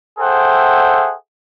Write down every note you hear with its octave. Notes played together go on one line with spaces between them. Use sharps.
G#4 A4 C5 E5 F#5 G5